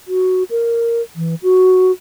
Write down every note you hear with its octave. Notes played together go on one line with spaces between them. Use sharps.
F#4
A#4
E3
F#4